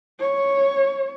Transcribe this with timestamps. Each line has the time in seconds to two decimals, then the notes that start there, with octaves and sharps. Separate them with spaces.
0.20 C#5